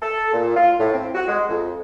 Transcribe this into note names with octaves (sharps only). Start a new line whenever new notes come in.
A4
A#2
F4
A2
C4
F#4
G#3
F2